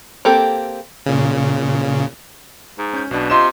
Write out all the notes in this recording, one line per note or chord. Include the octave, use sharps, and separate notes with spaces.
A#3 C4 G4 A4
A#2 C#3
G#2
C#4 G6
B1 B2 D4
C3 F4 D#5 C6 E7